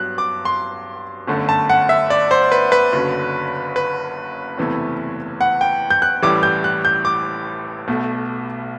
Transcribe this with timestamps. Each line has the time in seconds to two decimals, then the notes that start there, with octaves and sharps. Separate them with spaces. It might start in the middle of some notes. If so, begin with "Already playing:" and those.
Already playing: G2 F#3 B3 F#6
0.18 D6
0.45 C6
1.27 G1 F#2 D3 A3
1.49 A5
1.70 F#5
1.89 E5
2.10 D5
2.31 C5
2.52 B4
2.72 B4
2.92 F#1 F#2 D3 F#3
3.76 B4
4.57 F#1 E2 C3 E3 A3
5.41 F#5
5.61 G5
5.90 G6
6.02 F#6
6.22 A1 A2 E3 G3 D6
6.43 G6
6.64 F#6
6.85 G6
7.05 D6
7.88 B1 B2 A3